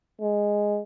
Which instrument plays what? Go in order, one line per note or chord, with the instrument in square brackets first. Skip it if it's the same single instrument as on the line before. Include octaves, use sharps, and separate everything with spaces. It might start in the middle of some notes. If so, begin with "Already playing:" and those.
[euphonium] G#3